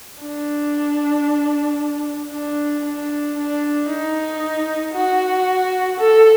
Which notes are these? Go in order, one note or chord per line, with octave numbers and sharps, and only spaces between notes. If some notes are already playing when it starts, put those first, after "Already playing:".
D4
D4
D4
D4
D#4
F#4
A4